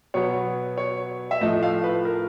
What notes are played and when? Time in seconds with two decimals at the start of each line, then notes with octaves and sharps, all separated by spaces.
0.14 B2 F#3 B3 C#5
0.78 C#5
1.31 E5
1.41 A2 F3 A3 D#5
1.63 F5
1.84 B4
2.05 A#4